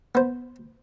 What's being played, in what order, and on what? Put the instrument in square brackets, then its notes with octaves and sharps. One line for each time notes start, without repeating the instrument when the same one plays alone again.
[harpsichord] B3 C5